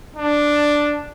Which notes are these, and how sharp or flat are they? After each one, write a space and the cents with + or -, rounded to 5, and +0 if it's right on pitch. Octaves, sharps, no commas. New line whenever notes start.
D4 +0